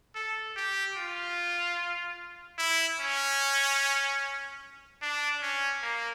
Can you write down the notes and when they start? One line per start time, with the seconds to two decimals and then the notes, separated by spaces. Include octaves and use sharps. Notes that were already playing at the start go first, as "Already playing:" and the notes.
0.15 A4
0.57 G4
0.97 F4
2.58 E4
2.99 C#4
5.01 D4
5.42 C#4
5.82 A#3